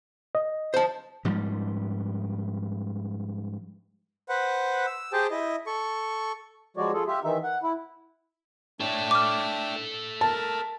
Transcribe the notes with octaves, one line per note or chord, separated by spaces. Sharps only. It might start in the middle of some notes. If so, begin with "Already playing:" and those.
D#5
C5 A5
G#2 F3 G3
B4 C5 F#5
E6
G4 G#4 C5 G5 A5
E4 D#5
A4 C#6
F3 G3 G#3 F#4 C#5 D5
F4 G#4 A4
F4 G4 E5
D#3 E3 D#4 E5
F#5
E4
A3 D4 A4 C#5 G5
D6 F6
A#4 A5